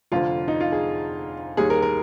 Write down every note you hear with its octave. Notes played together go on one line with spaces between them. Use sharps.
F1 F2 D3 F3 F4
D#4
F4
G#4
D#2 D#3 G3 G#4
A#4
A#4